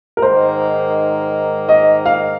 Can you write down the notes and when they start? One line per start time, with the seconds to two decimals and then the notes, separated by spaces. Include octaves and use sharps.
0.17 A#4
0.22 G#2 D#3 A#3 C5
1.69 D#5
2.06 F5